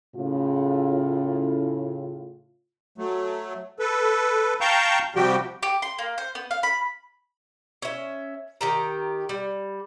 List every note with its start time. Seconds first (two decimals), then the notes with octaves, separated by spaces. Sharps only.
0.16 A2 C#3 F4
2.98 F#3 A3
3.79 A4 B4
4.61 F5 G5 A5 A#5 C#6 G6
5.15 C3 F3 G3 F#4 G4 G5
5.63 G4
5.82 C6
5.99 A#3
6.18 C5
6.35 B3
6.51 F5
6.63 B5
7.82 C#4 E5
8.61 D#3 G4 A#5
9.29 G3